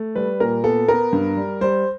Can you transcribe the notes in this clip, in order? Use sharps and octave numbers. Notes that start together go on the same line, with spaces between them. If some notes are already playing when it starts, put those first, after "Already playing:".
Already playing: A3
G3 B4
A#2 A#4
B3 A4
B3 A#4
G2
G3
G3 C5